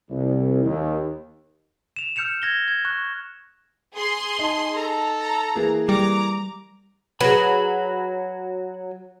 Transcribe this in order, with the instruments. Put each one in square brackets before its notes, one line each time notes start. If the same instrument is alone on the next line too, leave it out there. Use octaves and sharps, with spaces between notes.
[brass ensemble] C2
D#2
[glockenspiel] E7 F7
E6 F6 G6 C#7 E7 F7
G#6 A#6 G7
G#6
C#6 F#6
[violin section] G#4 C6
[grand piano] D#4 A5
[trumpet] A4 [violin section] A#5
[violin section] A#5
[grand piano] E3 A#3 G#4
[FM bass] G3 [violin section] A#5 [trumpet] D6
[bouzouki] F#3 [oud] G#4 B4 [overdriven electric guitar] B5